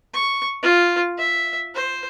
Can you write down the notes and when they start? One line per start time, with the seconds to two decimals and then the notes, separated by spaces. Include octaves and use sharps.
0.14 C#6
0.63 F4
1.18 E5
1.75 C5